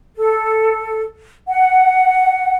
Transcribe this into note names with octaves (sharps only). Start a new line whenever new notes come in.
A4
F#5